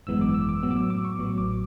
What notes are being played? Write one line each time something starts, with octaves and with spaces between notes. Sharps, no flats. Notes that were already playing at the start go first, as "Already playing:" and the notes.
G#1 F#2 E3 G#3 B3 E6
D6
E6
D6
A2 F#3 B3 E6
D6
E6
D6
C#6
A1 A2 F#3 B3
D6